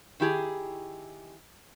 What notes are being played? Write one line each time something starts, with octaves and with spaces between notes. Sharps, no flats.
D#3 E4 G4 G#4